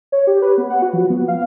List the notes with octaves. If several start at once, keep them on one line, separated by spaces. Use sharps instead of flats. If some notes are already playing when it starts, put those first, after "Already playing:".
C#5
G4
B4
B3
F#5
F#4
F3
B3
F5